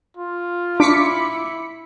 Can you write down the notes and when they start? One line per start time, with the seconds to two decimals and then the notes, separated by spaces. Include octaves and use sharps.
0.17 F4
0.80 D4 E4 C#6 D6 B6 C#7